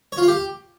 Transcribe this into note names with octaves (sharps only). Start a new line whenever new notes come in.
C#5
F4
F5
G4